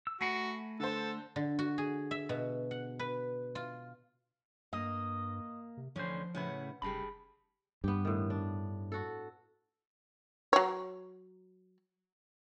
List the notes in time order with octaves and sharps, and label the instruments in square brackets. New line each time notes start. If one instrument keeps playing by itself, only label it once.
[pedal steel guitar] E6
[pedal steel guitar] A3 G#5 B5 [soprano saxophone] F#4 [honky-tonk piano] A#6 C7 C#7
[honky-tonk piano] D3 C5 [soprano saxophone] A4
[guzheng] D3
F#4
G#4
E5
B2
F#5
B4
F4
[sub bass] G2 [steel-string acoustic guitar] A#3 [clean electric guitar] D#5
[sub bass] C3
[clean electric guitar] D2 D3 C5 [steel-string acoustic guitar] E3 C#4 [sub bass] F3
[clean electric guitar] A2 C#3 B4 [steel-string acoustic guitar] C#4 E4 F#5
[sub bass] F1 [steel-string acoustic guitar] C#3 G3 A4 [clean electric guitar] G#4 A5 B5
[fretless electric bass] G2 [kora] B3 G4
[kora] A2 D#3
D4
F#4 A4
[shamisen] F#3 C#5